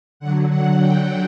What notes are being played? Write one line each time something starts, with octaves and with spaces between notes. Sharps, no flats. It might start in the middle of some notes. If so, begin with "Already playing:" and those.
D3 F#3 F#5
F#5
G5